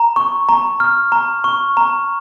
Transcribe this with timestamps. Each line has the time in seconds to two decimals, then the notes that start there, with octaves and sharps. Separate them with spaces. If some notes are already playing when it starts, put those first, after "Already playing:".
Already playing: A#5
0.16 C#6
0.49 A#5
0.80 F6
1.12 A#5
1.44 C#6
1.77 A#5